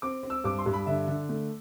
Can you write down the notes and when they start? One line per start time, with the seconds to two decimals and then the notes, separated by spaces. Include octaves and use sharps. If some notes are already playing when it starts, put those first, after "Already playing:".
0.02 C4 D6
0.23 C4
0.30 E6
0.44 G2 D6
0.59 C6
0.66 G2
0.73 B5
0.86 D3 E5
1.07 D3
1.29 A3